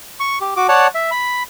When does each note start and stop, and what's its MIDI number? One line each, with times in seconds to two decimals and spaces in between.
0.20 0.39 85
0.41 0.54 67
0.57 0.67 66
0.57 0.67 86
0.69 0.87 73
0.69 0.87 74
0.69 0.87 78
0.69 0.87 81
0.95 1.11 76
1.11 1.43 83